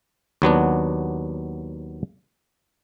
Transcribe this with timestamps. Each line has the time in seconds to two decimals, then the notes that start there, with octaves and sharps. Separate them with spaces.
0.42 D#2 F#3 B3 D4